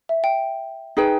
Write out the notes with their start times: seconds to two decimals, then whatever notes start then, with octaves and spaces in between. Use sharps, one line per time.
0.09 E5
0.24 G5
0.97 D#4 G#4 B4 G5